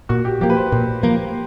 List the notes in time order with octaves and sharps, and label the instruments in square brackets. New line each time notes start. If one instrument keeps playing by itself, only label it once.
[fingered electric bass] A#2 [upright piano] F#4
[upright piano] G4
[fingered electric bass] F3 A#3 [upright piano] G4
[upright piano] B4
C5
[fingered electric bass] A#2
F3 A#3